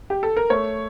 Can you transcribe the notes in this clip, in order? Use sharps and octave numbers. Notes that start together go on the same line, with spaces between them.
G4
A4
A#4
A3 C#5